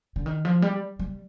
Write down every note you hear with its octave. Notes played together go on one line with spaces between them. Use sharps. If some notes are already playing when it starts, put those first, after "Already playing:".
D3
D#3
F3
G3
G3